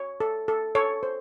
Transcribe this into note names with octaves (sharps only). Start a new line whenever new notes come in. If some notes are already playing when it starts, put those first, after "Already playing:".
Already playing: C#5
A4
A4
A4 C#5
C5